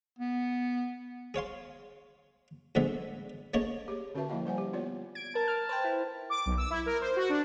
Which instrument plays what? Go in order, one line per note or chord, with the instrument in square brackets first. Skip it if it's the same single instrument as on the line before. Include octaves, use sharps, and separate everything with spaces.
[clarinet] B3
[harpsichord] G#4 C#5 F5 C6
A2 D3 F3 G#3 B3 E5
A3 A#3 C#4 G#4 C#5 D#5
[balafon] G4 G#4 C#5
D3 C#4 F#4 B4 E5 A5
F3 A#3 E4 D#5 F5 G5
G3 C5 F#5 G#5
G4
B3 F4 C#5 D5
[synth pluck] G#6 D7
[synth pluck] A#4 [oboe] A5
[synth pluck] F6
B4 C5 G5
E4
[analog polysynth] D6
B1
E6
E4
A#4
C5
F#4
D4